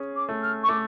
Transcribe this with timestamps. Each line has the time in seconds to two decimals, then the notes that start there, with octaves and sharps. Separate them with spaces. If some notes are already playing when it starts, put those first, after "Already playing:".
Already playing: C#4 G#4
0.16 D6
0.29 A3
0.42 F6
0.63 C#6
0.69 A3 D6